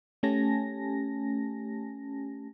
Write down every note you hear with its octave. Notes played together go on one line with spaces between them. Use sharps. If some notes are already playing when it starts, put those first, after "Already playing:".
A3 C#4 G4 G#5 A5 A#6